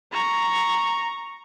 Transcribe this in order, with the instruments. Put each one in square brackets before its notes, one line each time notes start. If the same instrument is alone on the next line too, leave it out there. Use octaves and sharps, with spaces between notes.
[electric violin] A#5 [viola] C#6